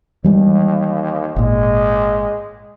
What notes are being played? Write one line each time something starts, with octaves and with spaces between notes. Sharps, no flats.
D#2 E3 G3 G#3
G#1 A#2 G#3